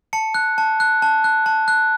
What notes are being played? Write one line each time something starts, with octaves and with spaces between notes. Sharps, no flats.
A5 C#7
F#6
A5
F#6
A5
F#6
A5
F#6